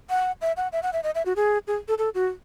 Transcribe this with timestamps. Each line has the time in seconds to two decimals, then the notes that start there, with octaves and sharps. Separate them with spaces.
0.10 F#5
0.41 E5
0.57 F#5
0.72 E5
0.83 F#5
0.93 E5
1.03 D#5
1.15 E5
1.26 F#4
1.36 G#4
1.68 G#4
1.88 A4
1.98 A4
2.15 F#4